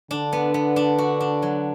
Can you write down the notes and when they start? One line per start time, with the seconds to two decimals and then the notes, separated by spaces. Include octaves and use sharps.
0.11 D3 D4
0.33 B3
0.54 B3
0.76 D4
0.98 F#4
1.20 D4
1.43 F#3